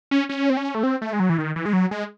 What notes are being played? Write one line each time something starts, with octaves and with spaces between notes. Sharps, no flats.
C#4
C#4
C4
C#4
A3
C4
A3
G#3
F#3
E3
D#3
E3
G#3
F#3
G#3